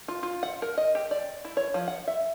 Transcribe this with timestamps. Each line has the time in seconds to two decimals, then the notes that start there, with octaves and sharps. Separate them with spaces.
0.08 F4
0.23 F4
0.43 F#5
0.62 A#4
0.77 D#5
0.95 G4
1.11 D5
1.45 E4
1.57 C#5
1.74 F3
1.88 F#5
2.07 E5